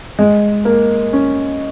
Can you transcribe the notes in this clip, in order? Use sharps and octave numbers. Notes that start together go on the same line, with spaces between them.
G#3
A#3
C#4